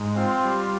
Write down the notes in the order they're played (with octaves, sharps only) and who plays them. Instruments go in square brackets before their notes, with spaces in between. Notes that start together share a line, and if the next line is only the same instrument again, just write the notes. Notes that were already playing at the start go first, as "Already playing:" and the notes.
Already playing: [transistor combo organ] G#2
[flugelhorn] C4 [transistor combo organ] F4
[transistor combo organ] G3